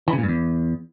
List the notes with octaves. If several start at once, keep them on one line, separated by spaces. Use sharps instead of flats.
E3
C#3
A#2
G2
E2